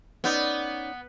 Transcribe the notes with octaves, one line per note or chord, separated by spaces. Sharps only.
B3 C#4 D#4 D5